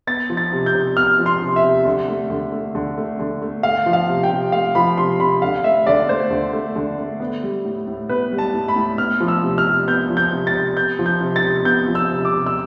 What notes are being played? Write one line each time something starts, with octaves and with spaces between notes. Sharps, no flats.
B3 A6
F3
A6
C3
G6
C3
B3 F6
F3
C6
C3
E5
C3
D3
A3
D3
A3
D3
A3
D3
A3
A3 F5
F3
F5
C3
G5
C3
A3 F5
F3 B5
C3 C6
C3 B5
D3 F5
A3 E5
D3 D5
A3 C5
D3
A3
D3
A3
B3
G3
A2
A2
B3 B4
G3
A5
A2
B5
A2
B3 F6
F3
E6
C3
F6
C3
B3 G6
F3
G6
C3
A6
C3
B3 G6
F3
G6
C3
A6
C3
B3 G6
F3
E6
C3
D6
C3
E6